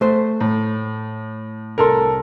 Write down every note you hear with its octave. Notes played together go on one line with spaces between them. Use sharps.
A3 C5
A2
C2 A4 A#4 C6